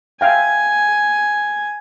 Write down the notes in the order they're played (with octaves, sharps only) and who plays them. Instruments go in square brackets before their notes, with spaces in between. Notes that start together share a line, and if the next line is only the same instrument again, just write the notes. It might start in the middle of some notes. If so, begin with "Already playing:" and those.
[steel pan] E5 F5 G5 [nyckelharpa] G#5